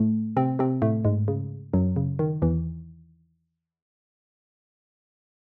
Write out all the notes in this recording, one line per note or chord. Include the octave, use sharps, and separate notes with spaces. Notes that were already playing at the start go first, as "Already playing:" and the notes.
Already playing: A2 A3
C3 C4
C3 C4
A2 A3
G#2 G#3
C#3
F#2 F#3
C#3
D#3
E2 E3